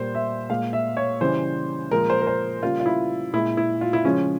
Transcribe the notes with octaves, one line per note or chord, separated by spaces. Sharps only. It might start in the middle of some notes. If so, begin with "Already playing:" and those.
Already playing: A#2 G3 A#3 C5
E5
A#2 G#3 F5
E5
C#5
C#3 E3 G3 C5
A#2 F3 G#3 A#4
C5
A#4
C5
C#3 G3 A#3 F4
F4
E4
A#2 G#3 E4
E4
F4
E4
C#3 F3 G#3 C#4